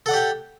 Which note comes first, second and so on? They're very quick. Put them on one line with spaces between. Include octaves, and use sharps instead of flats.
A4 F#5 D5 G4 G5